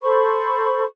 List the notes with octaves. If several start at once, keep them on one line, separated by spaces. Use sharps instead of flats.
A4 C5 B5 C#6